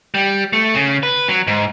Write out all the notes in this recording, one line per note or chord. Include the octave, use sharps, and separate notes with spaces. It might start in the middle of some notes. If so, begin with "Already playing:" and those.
G3
A3
C#3
B4
F#3
G#2